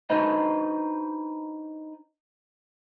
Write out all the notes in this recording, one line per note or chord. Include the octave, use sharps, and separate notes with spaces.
D4 D#4 F#4 B4 C5 D#5